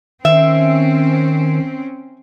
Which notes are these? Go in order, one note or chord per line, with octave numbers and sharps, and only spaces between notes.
D#3 C4 C#4 E5